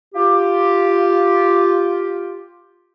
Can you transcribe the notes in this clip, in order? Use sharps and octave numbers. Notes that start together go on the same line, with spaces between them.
F4 G4